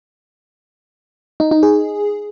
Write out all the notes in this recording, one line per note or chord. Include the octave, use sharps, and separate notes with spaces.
D#4
D#4
G#4